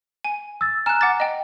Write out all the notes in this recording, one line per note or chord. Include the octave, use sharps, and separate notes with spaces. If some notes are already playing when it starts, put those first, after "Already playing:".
G#5
E6 A6
G#5 A#5 F6 F#6 E7
F#5 D6 A6
D#5 G5